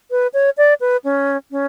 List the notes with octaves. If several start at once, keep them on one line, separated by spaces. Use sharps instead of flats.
B4
C#5
D5
B4
C#4
C#4